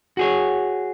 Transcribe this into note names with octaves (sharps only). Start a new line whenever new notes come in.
F#4 G#4 C#5